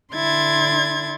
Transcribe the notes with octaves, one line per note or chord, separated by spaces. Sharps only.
D3 D4 E4 C6 G#6 A6